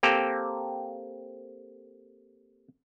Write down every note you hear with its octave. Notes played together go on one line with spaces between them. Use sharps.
A#3 C4 G4 A4